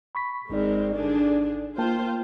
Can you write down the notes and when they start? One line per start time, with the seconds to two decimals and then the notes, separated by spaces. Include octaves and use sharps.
0.15 B5 C#6 B6
0.50 G#1 G#3 C4 D#4 A#4 D5
0.94 D3 D4 G#4
1.78 A#3 F4 C5 G5 A5